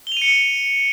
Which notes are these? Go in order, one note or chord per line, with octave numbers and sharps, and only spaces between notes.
C#7 D#7 F7 G7